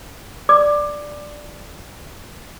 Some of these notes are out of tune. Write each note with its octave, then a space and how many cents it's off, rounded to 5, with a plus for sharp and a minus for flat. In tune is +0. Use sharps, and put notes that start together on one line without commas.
D5 +0 D6 +20